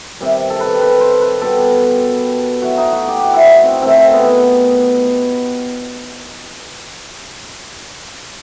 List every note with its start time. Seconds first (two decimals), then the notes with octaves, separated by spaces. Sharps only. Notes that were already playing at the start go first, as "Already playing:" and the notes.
0.20 C3 D#3 G3
0.50 A4
0.60 B4
0.81 B4
1.01 C5
1.21 B4
1.41 B2 G3 A4
2.61 A2 F#3 A3 F#4
2.77 D#4
2.92 F#4
3.08 G4
3.18 G4
3.23 F#4
3.33 E4
3.43 D#4
3.63 C4
3.82 C3 D#3 A3 C4
4.13 B3